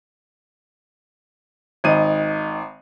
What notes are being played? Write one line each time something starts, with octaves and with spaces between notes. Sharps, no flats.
G#1 D#4 D#7